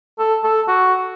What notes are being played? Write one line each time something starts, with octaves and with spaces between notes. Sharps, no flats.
A4
A4
F#4